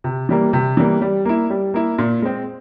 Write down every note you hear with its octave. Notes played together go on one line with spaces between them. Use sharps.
C3
E3 G3 A#3
C3
E3 G3 A#3
G3
A#3 E4
G3
A#3 E4
A#2
G#3 C4